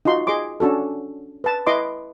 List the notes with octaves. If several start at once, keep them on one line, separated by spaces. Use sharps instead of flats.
D#4 F4 F#4 C6
G#4 D#5 C6 D6
C#4 D4 F#4 A4
B4 A5
E4 B4 D#5 C6 D6